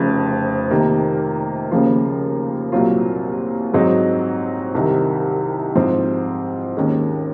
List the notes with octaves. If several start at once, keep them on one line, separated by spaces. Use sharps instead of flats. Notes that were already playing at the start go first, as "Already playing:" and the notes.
Already playing: F1 F2 C#3
C3 D#3 A#3
D#2 C#3 F3 A#3 F4
C2 A#2 F#3 C4 F4
G#2 F#3 C4 D#4 G#4
C2 C3 D#3
G#2 F3 C4
D#2 D#3 G#3 C#4